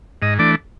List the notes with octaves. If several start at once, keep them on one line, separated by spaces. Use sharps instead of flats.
G#2 D#5
E3 A3 D4 D5